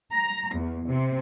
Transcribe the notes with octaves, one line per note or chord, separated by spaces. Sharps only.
A#5
E2
C3